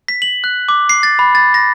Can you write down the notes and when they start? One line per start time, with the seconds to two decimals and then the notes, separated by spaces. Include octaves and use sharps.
0.08 B6
0.22 F#7
0.44 F#6
0.69 D6
0.89 C7
1.03 A6
1.19 B5
1.35 A6
1.54 A#6